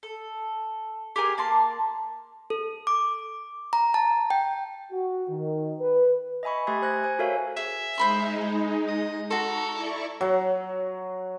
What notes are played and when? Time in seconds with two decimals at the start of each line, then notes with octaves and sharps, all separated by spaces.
0.03 A4
1.16 G4 G#4 A#4 G#5
1.38 A#3 A5 C6
2.50 A4
2.87 D6
3.73 A#5
3.94 A5
4.30 G5
4.93 F#4
5.30 D#3
5.81 B4
6.43 D#5 E5 G#5 B5 C#6
6.67 A3 G4 E5 G#5 C6 G#6
6.82 C5 F#6 G#6 A#6
7.04 C5 G#5
7.19 F#4 A4 A#4 C#5 E5 F5
7.57 G#4 E5
7.98 G#3 D#4 C5 B5 C6
8.88 D#5
9.31 F#4 A4 A#5 C6 C#6
9.73 E4 D5 C#6
10.21 F#3